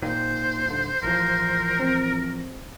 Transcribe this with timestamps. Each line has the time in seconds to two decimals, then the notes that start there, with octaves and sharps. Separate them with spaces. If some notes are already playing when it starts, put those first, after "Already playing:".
0.02 A#2 D#3 C5
0.66 D#1 D3
1.03 A1 E2 F3 A#4
1.80 C4